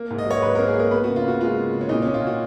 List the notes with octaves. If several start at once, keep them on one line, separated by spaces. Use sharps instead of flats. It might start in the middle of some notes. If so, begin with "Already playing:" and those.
Already playing: A#3
G#2
D#5
F#3 C#5
G#2 B4
A#4
A#3
G#4
A#3 A#4
B3 B4
F#4
C#3
F4
C#3 F#4
G#3 F4
C#3
C#3
C#4
A#2 D#4
A#2 C#4
F4
A#2 F#4